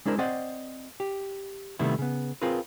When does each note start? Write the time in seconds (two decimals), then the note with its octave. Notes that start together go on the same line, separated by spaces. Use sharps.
0.06 G#3 D4 E4 A#4 C5
0.18 C4 C5 D5 D#5 F#5
1.00 G4
1.79 C3 D#3 G3 A3 B3 E4
1.99 C#3 B3
2.42 C4 F4 G#4 A#4 B4